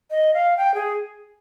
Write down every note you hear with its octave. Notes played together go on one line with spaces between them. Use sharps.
D#5
F5
G5
G#4